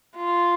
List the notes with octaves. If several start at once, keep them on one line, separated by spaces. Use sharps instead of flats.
F4